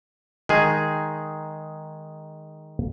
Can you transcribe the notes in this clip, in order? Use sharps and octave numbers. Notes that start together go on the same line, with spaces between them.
D#3 G#3 D#4 G#4